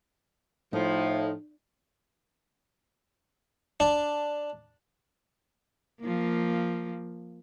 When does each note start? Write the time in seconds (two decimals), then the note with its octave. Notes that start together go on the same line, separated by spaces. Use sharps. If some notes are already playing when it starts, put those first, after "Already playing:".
0.73 A2 F3 D#4
3.80 D4
6.01 F3 A#3